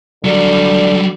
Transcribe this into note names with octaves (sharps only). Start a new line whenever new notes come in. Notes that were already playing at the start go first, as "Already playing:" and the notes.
D3 F#3 G3